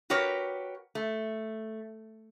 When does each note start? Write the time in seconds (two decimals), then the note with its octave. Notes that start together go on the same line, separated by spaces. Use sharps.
0.10 F#4 G4 A#4 B4 C#5
0.95 A3